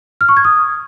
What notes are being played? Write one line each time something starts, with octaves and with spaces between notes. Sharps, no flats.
F6
C#6
G#6
D#6